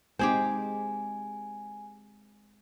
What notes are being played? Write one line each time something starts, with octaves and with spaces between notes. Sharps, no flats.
G#3 C4 D#4 G4 G#4 C5 G#5